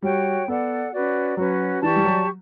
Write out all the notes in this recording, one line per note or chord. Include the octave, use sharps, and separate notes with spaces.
G3 F#4 C#5 G5
B3 A4 D5 F#5
C#4 F#4 B4 D5
F#3 C#4 F#4 B4
E3 G4 D5 A5 C#6
G3
F#3